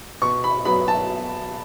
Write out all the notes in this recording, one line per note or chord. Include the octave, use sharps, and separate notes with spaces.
B2 C#6
B5
F#3 B3 B5
A5